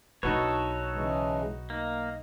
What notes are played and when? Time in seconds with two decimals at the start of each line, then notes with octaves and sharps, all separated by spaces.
0.23 B1 D4 D#4 F#4 A4 B4 C#5
0.94 C#3 E3 G#3
1.70 A#3 D#4